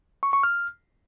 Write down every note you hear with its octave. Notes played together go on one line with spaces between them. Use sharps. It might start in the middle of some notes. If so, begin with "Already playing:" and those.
C#6
C#6
F6